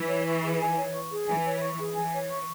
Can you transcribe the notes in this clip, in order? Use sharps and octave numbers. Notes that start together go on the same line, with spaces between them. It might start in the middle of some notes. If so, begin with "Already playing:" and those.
Already playing: E3
C#5
C#6
G#4
G#5
C#5
C#6
G#4
E3 G#5
C#5
C#6
G#4
E3 G#5
C#5
C#6